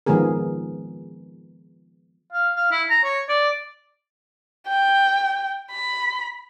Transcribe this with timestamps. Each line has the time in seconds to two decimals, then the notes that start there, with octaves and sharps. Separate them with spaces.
0.06 D#3 F3 G#3 B3 G#4 A#4
2.33 F5
2.56 F5
2.71 E4
2.90 A#5
3.04 C#5
3.29 D5
4.68 G5
5.71 B5